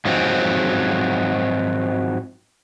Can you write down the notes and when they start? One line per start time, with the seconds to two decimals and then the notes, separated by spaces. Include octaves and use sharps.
0.05 G#2 F3 F#3 C4